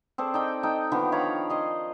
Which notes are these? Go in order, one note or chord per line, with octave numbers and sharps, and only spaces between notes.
C4 G#4 A4 D5
D#4 D5 G5
D#4 A4 G5
D3 D#3 F3 B3
C#5 F5 A#5 B5
D5 D#5 C6